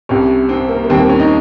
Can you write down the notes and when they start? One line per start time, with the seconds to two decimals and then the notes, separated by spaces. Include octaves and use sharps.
0.09 C2 C3 G3 C#4
0.49 C4
0.69 A#3
0.84 A#3
0.89 D#2 D#3 G3 C4
0.99 A#3
1.09 C#4
1.20 D#4